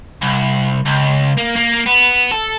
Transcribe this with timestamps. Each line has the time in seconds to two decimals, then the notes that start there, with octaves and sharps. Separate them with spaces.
0.22 C2
0.85 C#2
1.37 A#3
1.56 A#3
1.86 B3
2.31 A4